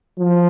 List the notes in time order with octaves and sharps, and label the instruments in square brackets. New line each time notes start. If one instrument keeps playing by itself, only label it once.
[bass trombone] F3